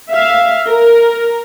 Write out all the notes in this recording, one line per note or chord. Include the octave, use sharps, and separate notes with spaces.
E5 F5
A#4